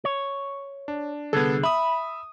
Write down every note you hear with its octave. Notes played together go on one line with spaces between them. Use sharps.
C#5
D4
C2 D3 B3 G#4 A4
E5 B5 D#6